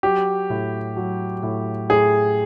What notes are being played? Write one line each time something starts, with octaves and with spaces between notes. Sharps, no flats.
F#3 G4
A2
F#3
A2
A2 G#4